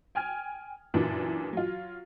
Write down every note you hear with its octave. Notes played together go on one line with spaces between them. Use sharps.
G5 G#5 F6 G#6
F#2 A#2 E3 F#3 D4
F#3 F4